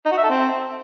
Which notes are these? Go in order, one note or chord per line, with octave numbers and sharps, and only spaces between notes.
D#4
F#4
E5
A4
C4